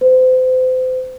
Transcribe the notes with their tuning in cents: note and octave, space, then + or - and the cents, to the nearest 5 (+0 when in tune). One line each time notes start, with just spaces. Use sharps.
C5 -35